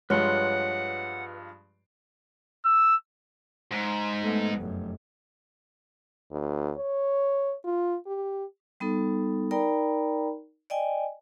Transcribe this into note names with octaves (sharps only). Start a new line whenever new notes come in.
G2 F3 G#3 B4 C#5 F#5 C6
E6
G#2
A3 B3
F1 F#2
D2
C#5
F4
G4
G3 B3 D#4 A4
D#4 A#4 D5 G5 A#5 B5
D5 D#5 G5 G#5